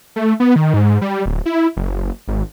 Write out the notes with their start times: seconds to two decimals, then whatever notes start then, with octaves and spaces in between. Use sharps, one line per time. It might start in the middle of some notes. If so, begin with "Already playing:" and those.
0.16 A3
0.40 B3
0.56 D#3
0.74 G#2
1.01 G3
1.26 D1
1.46 E4
1.77 F#1
2.28 G#1